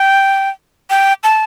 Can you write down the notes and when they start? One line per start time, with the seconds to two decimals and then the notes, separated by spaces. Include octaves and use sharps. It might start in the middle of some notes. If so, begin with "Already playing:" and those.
Already playing: G5
0.90 G5
1.24 A5